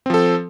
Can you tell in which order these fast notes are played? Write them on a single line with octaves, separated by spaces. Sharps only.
C4 F3 A4